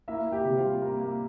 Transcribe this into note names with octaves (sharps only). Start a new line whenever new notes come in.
A#3 E4 E5
A#3
G4 G5
C3
F4 F5
G3
A#3
A#3